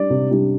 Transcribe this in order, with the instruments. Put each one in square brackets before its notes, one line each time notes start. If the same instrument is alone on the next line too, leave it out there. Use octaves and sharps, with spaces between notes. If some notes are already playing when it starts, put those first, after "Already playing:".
Already playing: [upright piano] G3 D4 [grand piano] D5
[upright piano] C3
G3 D4